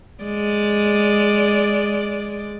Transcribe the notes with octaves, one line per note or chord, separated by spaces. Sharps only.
G#3 D5